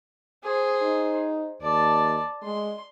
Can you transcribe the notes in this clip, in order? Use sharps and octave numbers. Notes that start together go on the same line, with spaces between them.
G#4 C5
D#4
D#2 D5 A5
G#3 C6